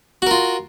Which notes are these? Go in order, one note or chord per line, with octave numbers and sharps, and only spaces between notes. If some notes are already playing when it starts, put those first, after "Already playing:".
F4 F#4 A#4